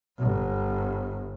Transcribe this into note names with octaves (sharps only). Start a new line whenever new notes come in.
G1